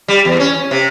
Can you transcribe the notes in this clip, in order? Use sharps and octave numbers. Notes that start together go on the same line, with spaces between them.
G3
E2
C#4
C3